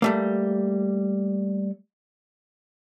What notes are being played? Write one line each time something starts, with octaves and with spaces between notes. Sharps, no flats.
G3 A3 A#3